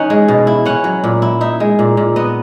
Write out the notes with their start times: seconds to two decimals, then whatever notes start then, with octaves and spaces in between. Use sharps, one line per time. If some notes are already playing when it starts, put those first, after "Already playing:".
Already playing: E3 C#4 D#4 F#5
0.10 G#3
0.28 B2
0.47 E4
0.66 C#4 F#5
0.84 F#3
1.04 A#2
1.22 E4
1.41 D#4 E5
1.60 G#3
1.79 A#2
1.97 A#2
2.16 B3 D#5